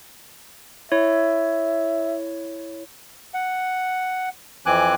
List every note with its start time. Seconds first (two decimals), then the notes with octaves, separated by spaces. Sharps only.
0.92 E4 C#5 E5
3.34 F#5
4.66 F2 E3 C4 G#5 D6 F#6